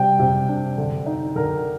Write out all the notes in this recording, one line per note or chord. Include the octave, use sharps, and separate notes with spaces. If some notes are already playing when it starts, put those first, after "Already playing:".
Already playing: C3 G3 G5
C3
D4
D3
D#4
D3 A#4